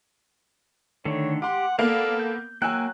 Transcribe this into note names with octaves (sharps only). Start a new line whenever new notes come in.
D3 D#3 A3 C#5
G4 F#5 C6 D6
A#3 B3 A4 D5 F5
G6
F#3 A#3 G5 G#5 E6 F#6